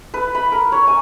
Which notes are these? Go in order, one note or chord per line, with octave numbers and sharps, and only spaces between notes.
B4
B5
A#4
C#5
G#5